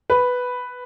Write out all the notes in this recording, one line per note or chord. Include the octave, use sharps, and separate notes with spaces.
B4